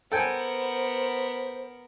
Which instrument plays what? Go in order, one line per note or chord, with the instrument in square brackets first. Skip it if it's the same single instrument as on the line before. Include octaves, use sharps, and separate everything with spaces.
[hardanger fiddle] B3 A#4 [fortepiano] A4 G5 G#5 [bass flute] C5